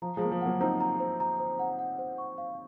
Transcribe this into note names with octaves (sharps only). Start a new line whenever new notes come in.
F3 A#5
F3 G#3
A#3 A#5
F3 G#3
F#3 A#3 F#5
C4 D#4 A#5
A#5
C5
A#5
C5
F#5
F#5
C5
C#6
F5